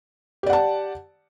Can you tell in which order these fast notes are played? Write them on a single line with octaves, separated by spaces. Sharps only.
G4 D5 F#5 A5